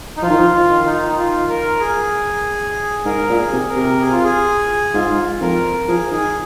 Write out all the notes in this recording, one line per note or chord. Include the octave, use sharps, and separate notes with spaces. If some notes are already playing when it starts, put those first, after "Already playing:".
D#4
F3 F4
D#3
F3
F4
D#3
F4
D#4
D#4
F4
A#4
G#4
G#2 A#4
A#2
G#4
C3
A#4
C3
G#4
F4
G#4
G#2 F4
F2 A#4
F3 G#4
D#3 G#4